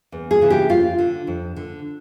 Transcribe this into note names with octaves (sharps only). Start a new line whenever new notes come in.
E2
G#4
C#3 E3
G4
F2 F4
D3
F2
D3